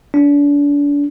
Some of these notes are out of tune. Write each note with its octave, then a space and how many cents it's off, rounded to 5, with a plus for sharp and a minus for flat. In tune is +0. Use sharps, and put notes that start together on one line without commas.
D4 -35